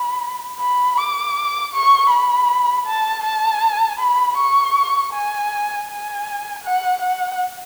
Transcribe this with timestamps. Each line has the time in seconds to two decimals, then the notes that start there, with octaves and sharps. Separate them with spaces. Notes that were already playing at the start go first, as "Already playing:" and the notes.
Already playing: B5
0.60 B5
0.97 D6
1.73 C#6
2.10 B5
2.86 A5
3.24 A5
3.99 B5
4.38 C#6
5.13 G#5
5.88 G#5
6.63 F#5
7.01 F#5